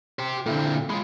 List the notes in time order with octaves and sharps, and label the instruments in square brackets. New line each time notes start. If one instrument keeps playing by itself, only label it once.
[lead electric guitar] G4 C5
[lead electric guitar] A#2 C4 [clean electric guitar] D3 E4 A4
[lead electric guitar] G#3 F4 [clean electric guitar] B5